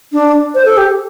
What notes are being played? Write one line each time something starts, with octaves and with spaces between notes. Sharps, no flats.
D4
C5
A4
G4